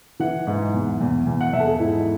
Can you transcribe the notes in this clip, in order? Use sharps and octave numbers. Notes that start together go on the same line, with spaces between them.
E3 F#5
G#2
E2
E2
E2
F#5
E2 E5
A4
G#4
G#2 E4